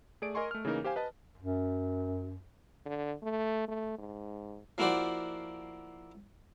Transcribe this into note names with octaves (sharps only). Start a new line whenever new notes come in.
A3 G#4 D5 D7
A#4 D#5 G#5 C6 C#6
A3 F6
C#3 E3 A#3 D#4 A#4
G4 C5 F5 G#5
B4 D#5 A5
F#2
D3
A3
A3
G#2
F3 A#3 E4 F#4 C5 D5